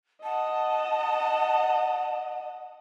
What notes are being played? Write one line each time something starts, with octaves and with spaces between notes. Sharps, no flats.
D#5 F#5 A5